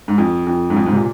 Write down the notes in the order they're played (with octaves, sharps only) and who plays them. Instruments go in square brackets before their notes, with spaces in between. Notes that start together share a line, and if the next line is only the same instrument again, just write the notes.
[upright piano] G#2
F2
F2
G#2
F2
G#2
C3
A#2